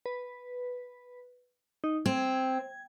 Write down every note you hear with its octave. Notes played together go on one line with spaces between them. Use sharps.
B4
D#4
C4 G#6